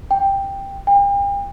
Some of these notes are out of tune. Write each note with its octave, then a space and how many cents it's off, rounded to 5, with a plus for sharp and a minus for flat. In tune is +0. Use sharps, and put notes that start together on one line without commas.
G5 +5
G5 +40